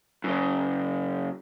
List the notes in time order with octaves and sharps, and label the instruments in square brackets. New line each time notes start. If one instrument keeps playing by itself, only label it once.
[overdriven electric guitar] F#2 C#3